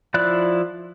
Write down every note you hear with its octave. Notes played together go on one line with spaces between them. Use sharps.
F3 E4 D5 F#6